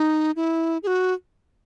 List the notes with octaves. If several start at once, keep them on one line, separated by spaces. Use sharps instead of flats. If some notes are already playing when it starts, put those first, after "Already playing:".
Already playing: D#4
E4
G#4
F#4